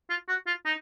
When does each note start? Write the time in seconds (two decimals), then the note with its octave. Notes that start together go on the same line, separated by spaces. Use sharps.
0.10 F4
0.29 F#4
0.47 F4
0.66 D#4